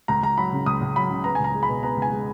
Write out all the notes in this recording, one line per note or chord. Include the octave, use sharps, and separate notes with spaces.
C#2 A#5
C#2 A#5
F#3 B5
C#3
C#2 D#6
C#2
F#3 B5
C#3
B3 A#5
G#5
C#2 A#5
G#3
B5
B2
B3 A#5
C#2
G#5
G#3